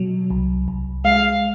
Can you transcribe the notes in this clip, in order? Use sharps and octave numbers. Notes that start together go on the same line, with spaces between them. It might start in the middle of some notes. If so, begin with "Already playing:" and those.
Already playing: B2 F#3
C2
C2
G#3 F5